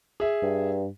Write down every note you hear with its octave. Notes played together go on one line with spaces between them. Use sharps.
G#4 E5
G2